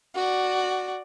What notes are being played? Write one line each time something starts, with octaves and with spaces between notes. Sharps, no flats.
F#4 D5